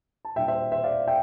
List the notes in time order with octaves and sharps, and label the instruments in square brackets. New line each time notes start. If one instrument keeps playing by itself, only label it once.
[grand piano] A5
A#2 G3 D4 E5 G5
C5 E5
C5 E5
D5 F5
E5 G5